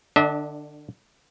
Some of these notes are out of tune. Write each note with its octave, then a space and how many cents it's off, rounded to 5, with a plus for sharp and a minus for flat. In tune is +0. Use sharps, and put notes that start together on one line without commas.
D3 +30 D4 +0 E5 -40